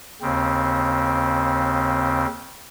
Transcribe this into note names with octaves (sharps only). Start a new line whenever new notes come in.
D#2 C#3 C4